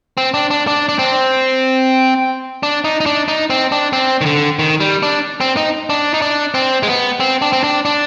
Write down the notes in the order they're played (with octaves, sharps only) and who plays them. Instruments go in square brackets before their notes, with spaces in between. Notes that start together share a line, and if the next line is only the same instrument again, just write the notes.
[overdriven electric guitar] C4
D4
D4
D4
D4
C4
D4
D#4
D#4
D4
D#4
C4
D4
C4
D#3
D3
D#3
G3
D4
C4
D#4
D4
D#4
D4
C4
G#3
B3
C4
D4
C4
D4
D4